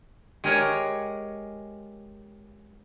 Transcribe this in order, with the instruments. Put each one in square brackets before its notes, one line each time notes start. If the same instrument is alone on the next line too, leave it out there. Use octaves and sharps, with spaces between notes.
[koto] G#3 G4 G#4 A#4 C#5 F#5